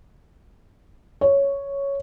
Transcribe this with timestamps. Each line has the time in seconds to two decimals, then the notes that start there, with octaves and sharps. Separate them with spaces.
1.21 C#5